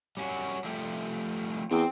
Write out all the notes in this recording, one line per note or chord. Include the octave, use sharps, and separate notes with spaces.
G3 C#4 F#4
F3 G3 A3
E2 C4 G5